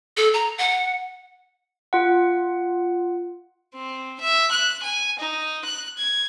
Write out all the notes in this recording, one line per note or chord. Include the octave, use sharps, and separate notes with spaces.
A4
A#5
F#5
F4 F#5
C4
E5
F#6
G#5
D#4
F#6
G#6